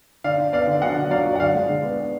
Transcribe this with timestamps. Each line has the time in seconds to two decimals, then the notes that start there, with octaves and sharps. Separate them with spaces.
0.24 D3 D5 F5
0.38 D3
0.53 B3 D5 F5
0.67 D3
0.82 F#3 D#5 F#5
0.96 D3
1.11 F#3 D5 F5
1.26 F#3
1.36 F#5
1.40 D3 D5 F5
1.54 G#3
1.69 D3
1.83 B3
1.99 B3